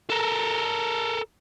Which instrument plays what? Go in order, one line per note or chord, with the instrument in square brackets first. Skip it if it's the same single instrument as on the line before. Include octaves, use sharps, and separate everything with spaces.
[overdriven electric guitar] A4 A#4